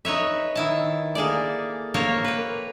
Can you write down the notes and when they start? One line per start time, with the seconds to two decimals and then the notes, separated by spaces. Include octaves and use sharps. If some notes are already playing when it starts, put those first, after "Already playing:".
0.05 D#4 B4 C#5 E5
0.55 D#3 E4 A5
1.15 A#3 G#4 A4 D5
1.94 A#3 A4 A#4 C5 C#5
2.24 B4 G5